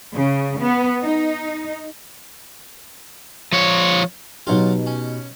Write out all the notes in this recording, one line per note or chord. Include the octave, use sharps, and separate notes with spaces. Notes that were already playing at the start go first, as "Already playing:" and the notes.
C#3
B3
D#4
F3 C#5
B2 F#3 D#4 F4 G4
C#4